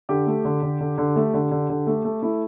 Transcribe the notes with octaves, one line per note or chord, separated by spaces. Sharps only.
D3 G4
A3
D3
D3
D3
D3
A3
D3
D3
D3
A3
A3
A3 E4